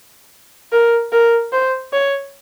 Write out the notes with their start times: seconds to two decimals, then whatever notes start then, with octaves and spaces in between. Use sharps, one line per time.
0.72 A#4
1.13 A#4
1.52 C5
1.93 C#5